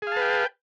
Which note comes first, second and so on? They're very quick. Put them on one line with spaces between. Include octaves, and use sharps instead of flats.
G#4 F5 A5 B4 G5